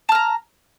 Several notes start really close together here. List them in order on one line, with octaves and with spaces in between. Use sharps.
A5 F6 A#5